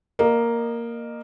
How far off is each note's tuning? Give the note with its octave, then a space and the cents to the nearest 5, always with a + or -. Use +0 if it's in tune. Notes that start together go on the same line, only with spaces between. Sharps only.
A#3 +0 D#5 -30